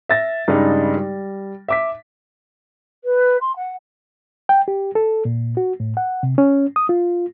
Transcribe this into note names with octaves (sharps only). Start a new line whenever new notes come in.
E5 A6 A#6
G2 C#3 G3 G#3 D#4
G3
E5 D6 B6
B4
C6
F#5
G5
G4
A4
A#2
F#4
A2
F#5
C3
C#4
D#6
F4